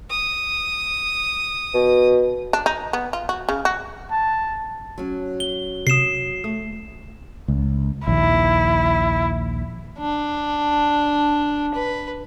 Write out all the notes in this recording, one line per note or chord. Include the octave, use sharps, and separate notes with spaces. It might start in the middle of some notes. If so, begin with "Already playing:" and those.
D#6
B2
D4
D#4
B3
F4
F#4
C#3
F#4
A5
F#3 C#4
G7
C3 D#6 C7 E7
A3 D#6
C#2
A#1 D#2 E4
D4
B4